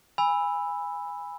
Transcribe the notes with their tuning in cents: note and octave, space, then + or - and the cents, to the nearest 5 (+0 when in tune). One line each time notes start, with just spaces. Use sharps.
G#5 -20 B5 +0 E6 +0